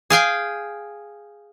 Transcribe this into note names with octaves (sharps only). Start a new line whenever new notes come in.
G#4 F5 G5 G#5